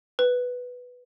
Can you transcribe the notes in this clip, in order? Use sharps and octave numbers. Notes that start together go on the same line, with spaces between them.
B4